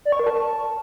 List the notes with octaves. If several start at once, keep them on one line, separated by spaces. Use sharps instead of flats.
D5
C#6
A#4
A5